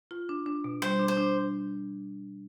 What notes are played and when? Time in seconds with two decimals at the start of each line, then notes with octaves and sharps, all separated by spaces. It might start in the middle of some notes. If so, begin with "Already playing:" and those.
0.11 F4
0.29 D4
0.46 D4
0.64 B2
0.82 G3 C5
0.99 D4
1.08 C5
1.17 D4